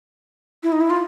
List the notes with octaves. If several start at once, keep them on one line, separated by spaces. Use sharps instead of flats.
E4
D#4
E4
F4